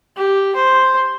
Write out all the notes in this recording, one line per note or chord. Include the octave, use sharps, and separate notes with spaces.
G4
C5